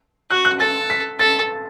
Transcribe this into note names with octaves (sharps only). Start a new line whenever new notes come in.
F#4 F#6
F#6
A4 A6
B6
A4 A6